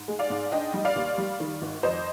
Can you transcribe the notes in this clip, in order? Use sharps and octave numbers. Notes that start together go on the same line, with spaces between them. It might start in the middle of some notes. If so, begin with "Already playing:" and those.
Already playing: G#2
G#3
D5 F5
G#2
D4 D#5 G5
G3
D5 F5
D#2
G3
D#3
G#1
F2 C5 D#5